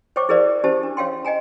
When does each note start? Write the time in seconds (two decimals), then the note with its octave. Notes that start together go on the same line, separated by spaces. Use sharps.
0.16 C5 C#5 G5 C#6 D6
0.29 E4 G#4 A#4 C5 D5 F5
0.64 C#4 E4 G4 C5 A5
0.83 D4
0.97 C#5 F5 G5 C6
1.25 D#5 G5 G#5 A#5